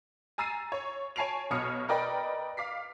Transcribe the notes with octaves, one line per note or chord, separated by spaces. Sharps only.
G#5 A#5 E6 A6 C7 D#7
C#5
C#5 G#5 A5 C7 D7 F7
B1 B2 C#5 D#6 F6 C#7
A#4 B4 D5 D#5 G5 B5
F5 D6 B6 C7